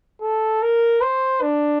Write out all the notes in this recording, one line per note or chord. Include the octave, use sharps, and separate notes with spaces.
A4
A#4
C5
D4